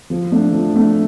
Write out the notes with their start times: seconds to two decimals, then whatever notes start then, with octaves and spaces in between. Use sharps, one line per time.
0.10 F3
0.32 A3 D4
0.52 F3
0.74 A3 D4